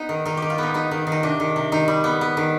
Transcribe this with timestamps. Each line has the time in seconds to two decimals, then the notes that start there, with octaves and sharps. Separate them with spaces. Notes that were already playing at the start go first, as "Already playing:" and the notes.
Already playing: B3 D#4
0.09 D#3
0.25 D#3 D#4
0.37 D#3 G4
0.50 F4
0.58 B3 D#4
0.74 B3 D#4
0.91 D#3
1.07 D#3
1.12 D#4
1.23 C3 D4
1.40 D#3
1.56 C3
1.72 D#3 D#4
1.88 G3
2.04 B3
2.21 B3
2.37 D#3